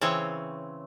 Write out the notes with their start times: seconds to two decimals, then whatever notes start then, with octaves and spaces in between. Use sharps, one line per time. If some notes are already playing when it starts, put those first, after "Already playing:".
0.01 C#3 E3 C4 C#5